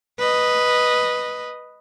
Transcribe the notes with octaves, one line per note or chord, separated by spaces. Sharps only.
B4 D#5